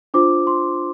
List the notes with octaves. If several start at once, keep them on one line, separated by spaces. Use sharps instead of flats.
D4 F4 C5 D6
C6